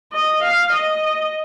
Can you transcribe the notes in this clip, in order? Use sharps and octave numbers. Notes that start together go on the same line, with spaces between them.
D#5
F5
D#5